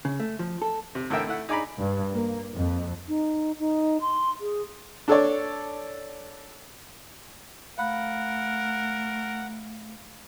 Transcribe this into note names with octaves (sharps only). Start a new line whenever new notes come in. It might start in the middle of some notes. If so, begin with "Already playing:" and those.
C#3
A3
F3
A4
C3
A2 D3 E3 A#4 E5 G5
A3 E4 F#5
D#4 G#4 D5 A#5 B5
G2
A#3
F2
D#4
D#4
C6
G#4
D4 A4 C#5 D5
A3 A#4 F5 F#5 B5 F#6